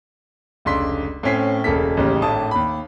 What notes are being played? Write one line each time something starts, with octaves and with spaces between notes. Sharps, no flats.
F1 C#2 D4 C6 B6
A2 C4 C#4 B6 C7
E1 C#3 A#3 A4 B6
A1 D#2 C#3 G3
G#1 A2 D4 A5 D#6
D#2 B5